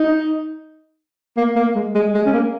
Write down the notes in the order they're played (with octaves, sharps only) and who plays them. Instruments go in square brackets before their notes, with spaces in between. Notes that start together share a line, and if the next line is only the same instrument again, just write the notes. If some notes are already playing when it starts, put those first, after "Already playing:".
Already playing: [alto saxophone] D#4
A#3
A#3
G#3
G#3
G#3
C#4
A#3